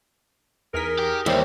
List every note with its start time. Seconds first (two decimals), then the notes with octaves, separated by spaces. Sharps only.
0.74 E2 D#4 G#4 A#4 B6
0.99 G4
1.26 D#2 E3 G3 C5 D5 E5